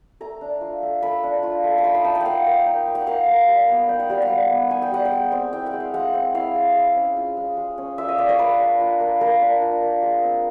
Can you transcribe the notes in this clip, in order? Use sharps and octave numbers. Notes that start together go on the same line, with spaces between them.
A3 A#5
D4
F4
A3
A3 B5
D4
F4
A3
B5
D#4 C6
B5
D#4 A5
G5
A#3 F5 F#5
A#3
D#4
D#4
F#5
A#3 F5
A#3
G3
B3
D#4 G5
F#5
G3 F5
F#5
G3
B3
D#4 G#5
G5
G3 F#5
G5
G#3
C4
E4 G5
F#5
G#3
F5
G#3 F#5
C4
E4 F5
G#3
G#3
C#4
F4
G#3
G#3
C#4
F4 E5
D#5
G#3 D5
C#5
A#3 B4
D4
F4
A#3
A#3 A#4
D4
F4
A#3
G#3
C4